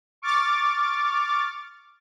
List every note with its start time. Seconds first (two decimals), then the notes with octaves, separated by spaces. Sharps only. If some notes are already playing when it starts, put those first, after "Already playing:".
0.22 C#6 D6 F6 A6